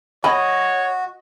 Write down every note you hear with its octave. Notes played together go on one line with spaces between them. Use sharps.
F#4 C#5 D#5 B5